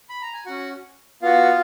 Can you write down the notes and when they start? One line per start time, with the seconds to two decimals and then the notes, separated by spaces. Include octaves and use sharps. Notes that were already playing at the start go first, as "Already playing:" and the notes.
0.09 B5
0.22 A#5
0.33 G#5
0.46 C#4 F#4 F#5
1.22 B3 F4 F#4 F5